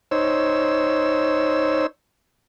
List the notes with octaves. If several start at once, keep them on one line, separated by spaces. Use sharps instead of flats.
D#4 C5 C#5 E6